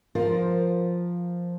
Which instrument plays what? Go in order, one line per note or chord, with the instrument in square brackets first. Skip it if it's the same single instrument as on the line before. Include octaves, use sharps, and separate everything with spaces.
[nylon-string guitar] F3 F4 A#4 C5